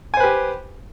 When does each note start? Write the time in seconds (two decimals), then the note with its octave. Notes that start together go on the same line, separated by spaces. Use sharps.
0.14 G#5
0.17 C5
0.20 B4
0.24 G4